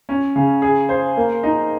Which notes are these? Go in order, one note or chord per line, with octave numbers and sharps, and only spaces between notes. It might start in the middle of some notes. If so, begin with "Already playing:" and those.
C#4
C#3
G#4
C5
A#3
D#4